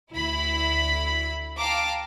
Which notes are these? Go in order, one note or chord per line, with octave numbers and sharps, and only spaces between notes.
D2 E4 B5
F5 G5 A5 A#5 D6